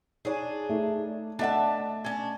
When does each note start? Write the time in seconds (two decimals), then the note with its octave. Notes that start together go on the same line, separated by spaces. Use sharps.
0.25 D4 D#4 G#4 C#5
0.69 A3 D#4
1.39 A3 D4 D#5 E5 F#5 A5
2.05 C#4 D4